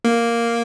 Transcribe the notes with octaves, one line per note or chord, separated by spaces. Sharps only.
A#3